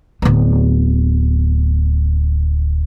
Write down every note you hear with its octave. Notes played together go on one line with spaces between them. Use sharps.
D1 B3